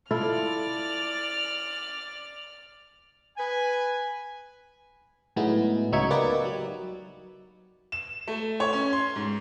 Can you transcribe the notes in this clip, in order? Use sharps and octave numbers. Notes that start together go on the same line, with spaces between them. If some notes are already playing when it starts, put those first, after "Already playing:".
E4 F4 A4 D5 F6
B4 G#5
A2 F#3 G#3 B3 D#4 E4
C#2 F#3 D#4 E5 C#6 G#6
A#3 B3 D#4 G4 B4 D5
F#3
E7
A3
C#5
C#4
C6
G#2